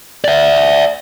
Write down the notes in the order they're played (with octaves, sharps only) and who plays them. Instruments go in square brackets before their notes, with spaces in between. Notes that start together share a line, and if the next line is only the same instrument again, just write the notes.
[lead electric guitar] D5 E5